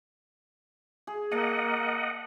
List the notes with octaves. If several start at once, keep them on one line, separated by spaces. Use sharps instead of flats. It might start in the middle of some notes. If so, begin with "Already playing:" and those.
G#4
A#3 D#5 F5 F#5 A5